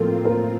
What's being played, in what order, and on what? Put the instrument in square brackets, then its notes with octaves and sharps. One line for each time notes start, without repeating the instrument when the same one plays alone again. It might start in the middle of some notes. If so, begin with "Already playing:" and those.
Already playing: [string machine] A2 F3 C4 F4 [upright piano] A#3 A4
[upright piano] A#3 A#4